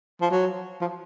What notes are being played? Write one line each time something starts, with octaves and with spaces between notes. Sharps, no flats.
F3
F#3
F3